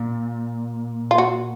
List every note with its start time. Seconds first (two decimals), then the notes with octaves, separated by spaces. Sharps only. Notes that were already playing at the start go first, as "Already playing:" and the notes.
Already playing: A#2
1.11 F4
1.18 F#4